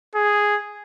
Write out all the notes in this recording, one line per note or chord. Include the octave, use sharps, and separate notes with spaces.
G#4